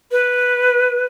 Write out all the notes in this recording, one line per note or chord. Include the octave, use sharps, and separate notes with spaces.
B4